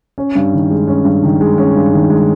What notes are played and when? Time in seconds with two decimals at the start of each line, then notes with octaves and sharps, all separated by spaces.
0.18 C#4
0.35 G2
0.53 D#3
0.71 G#3
0.88 C#4
1.05 G2
1.23 D#3
1.41 G#3
1.58 C#4
1.75 G2
1.93 D#3
2.10 G#3